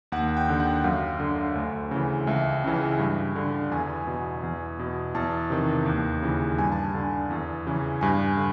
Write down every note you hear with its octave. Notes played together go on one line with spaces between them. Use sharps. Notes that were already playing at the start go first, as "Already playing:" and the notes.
D#2 F#5
G5
D3
F#5
F#2 F5
D3
D2
C#3 E3
C#2 E5
C#3 E3
G2
D3
E2 G#5
B2
E2
B2
E2 A5
C3 D#3
D#2
C#3 E3
G2 G#5
A5
G#5
D3
E2
C#3 E3
G2 G#5
D3